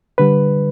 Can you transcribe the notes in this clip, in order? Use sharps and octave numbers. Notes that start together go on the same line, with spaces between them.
D3 G3 B4